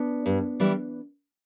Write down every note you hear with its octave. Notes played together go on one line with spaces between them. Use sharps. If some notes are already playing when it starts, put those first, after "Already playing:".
Already playing: B3 D4
G2
E3 G3